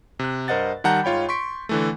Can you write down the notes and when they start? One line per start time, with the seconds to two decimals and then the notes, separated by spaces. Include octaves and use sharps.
0.19 C3 F#6
0.48 G2 A#4 C5 D#5 F#5 A6
0.84 D#3 G3 F#5 A5 A#5 G6
1.04 G#2 F4 C#5 G5 B5
1.29 C6 C#6 B6 D7
1.69 D3 E3 A3